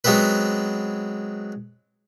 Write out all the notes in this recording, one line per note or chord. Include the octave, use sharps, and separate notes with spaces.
F#3 G#3 B3 C4 B4